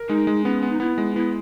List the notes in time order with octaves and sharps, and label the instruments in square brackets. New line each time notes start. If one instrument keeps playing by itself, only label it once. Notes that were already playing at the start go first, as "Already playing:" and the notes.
Already playing: [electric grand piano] A#4
[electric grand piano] G#3 [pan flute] D#4
[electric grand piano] G#3
[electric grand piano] B3 [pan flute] C#4
[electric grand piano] B3
[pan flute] D#4
[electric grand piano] B3 [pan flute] E4
[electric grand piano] G#3
[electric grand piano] B3 [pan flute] E4